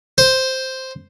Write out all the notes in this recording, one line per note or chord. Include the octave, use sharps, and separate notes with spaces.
C5